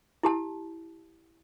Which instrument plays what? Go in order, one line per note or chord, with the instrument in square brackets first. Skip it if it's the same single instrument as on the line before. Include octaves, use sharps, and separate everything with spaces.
[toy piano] E4 G4 A5